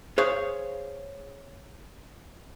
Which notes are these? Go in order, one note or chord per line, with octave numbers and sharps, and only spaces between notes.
G#4 C5 C#5 F5